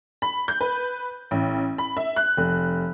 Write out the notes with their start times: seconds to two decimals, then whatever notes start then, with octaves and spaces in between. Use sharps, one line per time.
0.22 B5
0.48 G6
0.61 B4
1.31 A1
1.78 B5
1.97 E5
2.16 F#6
2.37 F1